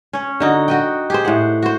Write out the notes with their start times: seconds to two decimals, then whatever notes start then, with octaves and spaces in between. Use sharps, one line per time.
0.13 C#4 C#5
0.40 D3 D#4 F#4
0.68 F#4 D#5 G5
1.10 G4 G#4 C5
1.25 A2 F#5
1.62 F#4 C5